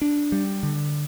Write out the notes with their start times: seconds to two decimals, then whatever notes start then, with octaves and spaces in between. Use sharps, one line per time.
0.02 D4
0.32 G3
0.63 D3